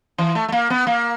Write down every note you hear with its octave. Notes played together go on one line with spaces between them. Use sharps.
E3
A3
A3
A#3
B3
A#3